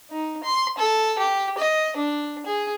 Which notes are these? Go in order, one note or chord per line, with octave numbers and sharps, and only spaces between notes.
D#4
C6
A4
G4
D#5
D4
G#4